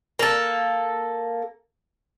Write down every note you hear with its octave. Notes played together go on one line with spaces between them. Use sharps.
A#3 A4